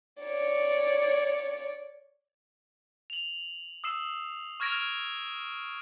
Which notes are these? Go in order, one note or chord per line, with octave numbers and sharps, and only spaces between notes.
C#5 D5
F7 F#7
D#6 E6 C7 E7
C#6 F6 G#6 A#6 D7 F7
F6 G#6